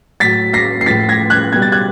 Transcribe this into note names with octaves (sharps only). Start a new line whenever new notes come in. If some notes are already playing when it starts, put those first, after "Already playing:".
A2 F#3 A6 B6
A#6 C7
C7
A2 F3 A6 B6
G#6 A#6
F#6 G#6
B2 G3 G#6
A6
F#6 G#6